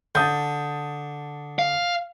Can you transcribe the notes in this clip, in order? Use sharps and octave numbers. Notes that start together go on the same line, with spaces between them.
D3 A5 D#6 G6
F5